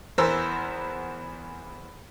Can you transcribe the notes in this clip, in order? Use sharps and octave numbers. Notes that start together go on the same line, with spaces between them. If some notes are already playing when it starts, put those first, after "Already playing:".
E2 E3 B3 A#4 C5 E6